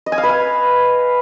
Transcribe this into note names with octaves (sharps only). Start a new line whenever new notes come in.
D#5
G#5
F5
B4
F5